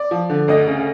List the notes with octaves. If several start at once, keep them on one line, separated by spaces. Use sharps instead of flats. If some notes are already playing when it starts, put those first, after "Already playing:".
Already playing: D5
F3
D3
D2 D#5
C#3